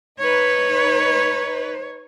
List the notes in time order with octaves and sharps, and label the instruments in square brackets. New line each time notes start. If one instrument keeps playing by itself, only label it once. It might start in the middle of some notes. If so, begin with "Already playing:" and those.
[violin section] D#4 B4 [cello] C#5